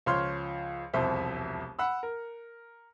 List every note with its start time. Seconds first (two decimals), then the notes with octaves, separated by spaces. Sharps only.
0.06 C#2 F3 C5 C#5 C6 F6
0.93 E1 C2 F2 C5 E5
1.79 F#5 B5 E6
2.03 A#4